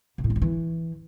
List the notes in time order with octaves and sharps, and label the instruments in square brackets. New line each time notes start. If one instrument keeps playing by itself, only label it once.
[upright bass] B2
A2
F#3
F3
E3